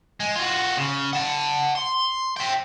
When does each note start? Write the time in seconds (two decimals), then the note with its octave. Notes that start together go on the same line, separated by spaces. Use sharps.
0.20 G#3
0.36 F4 F#4
0.77 C#3
1.13 F#5 A5
1.75 C6
2.37 E5 G5